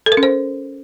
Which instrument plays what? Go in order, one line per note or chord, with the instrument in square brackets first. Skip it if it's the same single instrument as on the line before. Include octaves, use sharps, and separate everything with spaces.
[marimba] A4
A#4
C#4
C5